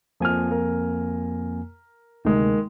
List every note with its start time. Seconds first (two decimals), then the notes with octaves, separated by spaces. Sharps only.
0.20 F2 F3 A#3 G#5 F6
0.51 A#4
2.25 D2 C3 D#3 G#3 A#3